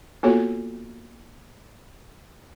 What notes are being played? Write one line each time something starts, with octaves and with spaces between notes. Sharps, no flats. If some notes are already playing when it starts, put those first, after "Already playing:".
A#3 B3 F4 F#4 A4 C#5